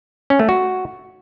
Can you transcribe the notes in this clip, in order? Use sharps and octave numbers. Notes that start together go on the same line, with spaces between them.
C#4
A3
F#4